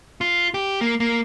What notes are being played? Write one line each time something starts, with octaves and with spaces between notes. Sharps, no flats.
F4
G4
A#3
A#3